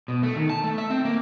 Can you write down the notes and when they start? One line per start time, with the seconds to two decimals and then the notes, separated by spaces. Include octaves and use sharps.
0.08 B2
0.23 A3
0.36 D#3
0.50 A5
0.64 A3
0.78 E5
0.90 C4
1.05 A#3